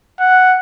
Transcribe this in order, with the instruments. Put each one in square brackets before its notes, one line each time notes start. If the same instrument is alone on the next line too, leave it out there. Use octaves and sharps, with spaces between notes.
[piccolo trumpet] F#5